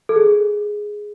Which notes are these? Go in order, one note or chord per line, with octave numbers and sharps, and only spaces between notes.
A4
G#4